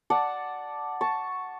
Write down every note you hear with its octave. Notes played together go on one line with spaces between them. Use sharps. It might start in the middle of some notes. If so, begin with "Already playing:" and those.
D5 F#5 A5
A5 C#6